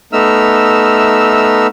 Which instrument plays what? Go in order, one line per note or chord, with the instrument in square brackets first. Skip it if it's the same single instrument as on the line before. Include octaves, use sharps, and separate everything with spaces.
[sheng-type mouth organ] A3 B3 D#4 E5 E6 F6